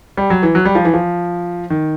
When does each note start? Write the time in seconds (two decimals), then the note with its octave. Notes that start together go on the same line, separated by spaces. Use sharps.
0.17 G3
0.30 F#3
0.43 E3
0.55 F#3
0.65 G3
0.75 F3
0.85 E3
0.94 F3
1.70 D#3